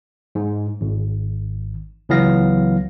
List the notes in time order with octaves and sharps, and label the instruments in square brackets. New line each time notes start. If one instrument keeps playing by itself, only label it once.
[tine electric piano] G#2
G#1
C#2 E3 F#3 B3 F5 A#6